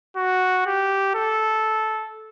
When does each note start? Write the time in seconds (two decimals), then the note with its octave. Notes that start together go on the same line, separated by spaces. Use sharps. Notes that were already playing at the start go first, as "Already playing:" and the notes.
0.17 F#4
0.66 G4
1.15 A4